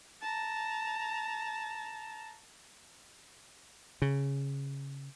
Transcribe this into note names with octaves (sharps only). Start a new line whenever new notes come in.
A5 A#5
C#3